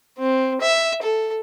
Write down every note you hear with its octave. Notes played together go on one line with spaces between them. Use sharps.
C4
E5
A4